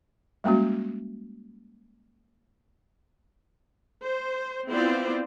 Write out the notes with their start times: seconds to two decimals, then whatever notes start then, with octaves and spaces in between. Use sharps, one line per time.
0.44 G3 G#3 A#3 C#4 F#4
4.04 C5
4.69 B3 C4 E4 F4 C5 D5